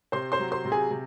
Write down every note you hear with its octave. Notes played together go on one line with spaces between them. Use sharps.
C3 C5 C6
C5 C6
F#3
C5 C6
C3
G#4 G#5
C3